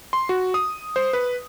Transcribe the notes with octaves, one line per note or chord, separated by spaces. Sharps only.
C6
F#4
D#6
C5
B4